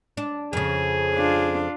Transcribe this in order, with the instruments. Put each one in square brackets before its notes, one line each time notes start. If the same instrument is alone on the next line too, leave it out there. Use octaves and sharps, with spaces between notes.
[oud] D4
[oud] F2 C#3 [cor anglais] G#4
[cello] D4 F4